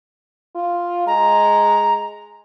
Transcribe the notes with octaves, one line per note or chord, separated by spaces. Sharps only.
F4
G#3 A#5